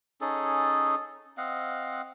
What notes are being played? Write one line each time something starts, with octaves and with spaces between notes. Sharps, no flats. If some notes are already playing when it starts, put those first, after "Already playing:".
C#4 D#4 G#4 A4
C4 D#5 F5 F#5